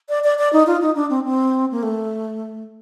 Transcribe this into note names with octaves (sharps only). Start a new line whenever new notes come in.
D5
D5
D5
D#4
F4
D#4
D4
C4
C4
A#3
A3